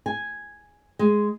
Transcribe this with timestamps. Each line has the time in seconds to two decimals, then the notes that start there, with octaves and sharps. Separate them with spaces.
0.06 G#5
0.99 G#3